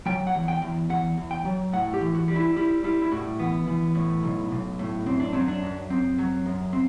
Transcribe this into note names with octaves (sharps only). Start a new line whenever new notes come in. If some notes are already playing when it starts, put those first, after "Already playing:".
F#3 G5
F#5
E2
G5
E2
E2 F#5
E2
G5
F#3
A2 F#5
G4
E3
F#4
G3
E4
G3 E4
G3 E4
E4
A2 F#4
E3 B3
E3
A2
B1
B1
A2
F#2 C4
D4
F#3 C4
D4
F#2
F#2 C4
F#3
F#2
C4